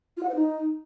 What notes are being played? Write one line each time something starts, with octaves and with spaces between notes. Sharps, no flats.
F4
F#5
C5
D#4